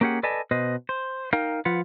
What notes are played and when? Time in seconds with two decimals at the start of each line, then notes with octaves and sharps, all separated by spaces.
0.01 A#3 C#4 G4 G#4 F#5
0.23 A4 B4 D5 D#5 G#5 A5
0.51 B2 B4 C5 D#5
0.89 C5
1.33 D#4 A#4 F5 G5
1.65 F3 F4 B4 F#5